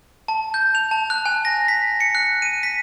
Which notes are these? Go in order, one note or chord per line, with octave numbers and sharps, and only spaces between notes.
A5
G6
F7
A5
F#6
G#5
A#6
B6
C#7
F#6
D#7
B6